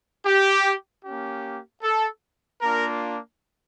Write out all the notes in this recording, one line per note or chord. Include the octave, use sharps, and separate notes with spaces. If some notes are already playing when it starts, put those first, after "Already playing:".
G4
A#3 C#4 G4
A4
A#3 D4 F4 A#4